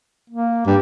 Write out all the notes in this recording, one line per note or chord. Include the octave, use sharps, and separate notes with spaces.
A#3
G2 G4